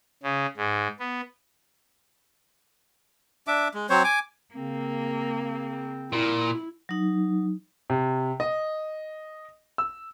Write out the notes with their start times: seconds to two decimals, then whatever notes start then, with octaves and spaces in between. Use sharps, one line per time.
0.23 C#3
0.57 G#2
1.00 B3
3.47 D4 E5 D6
3.74 G#3
3.90 F#3 C4 C5 C#5
4.04 G#5 D6
4.54 C#3 A#3 C4
6.13 A#2 E4
6.89 F#3 D#4
7.90 C3
8.40 D#5
9.78 E6